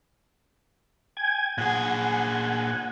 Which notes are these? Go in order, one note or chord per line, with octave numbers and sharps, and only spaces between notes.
G5 G#5 G#6
A#2 G#4 F#5 G#5